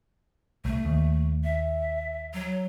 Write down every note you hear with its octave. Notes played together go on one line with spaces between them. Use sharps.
C2 A3
D#2
E5
F#3